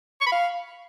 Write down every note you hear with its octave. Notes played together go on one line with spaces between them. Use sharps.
C#6
B5
F5